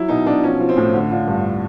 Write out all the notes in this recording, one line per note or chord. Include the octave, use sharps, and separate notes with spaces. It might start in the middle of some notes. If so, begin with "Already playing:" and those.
Already playing: F#3 E4
B2 D#4
B2 D4
F3 C#4
F3
C4
A2
D3
D3 F4
G2